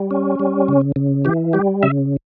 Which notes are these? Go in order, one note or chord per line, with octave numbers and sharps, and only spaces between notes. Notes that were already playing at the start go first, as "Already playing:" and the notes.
Already playing: G3
C#4
G3
C#3
C#3
E3 G4
G3 G4
C#3 E5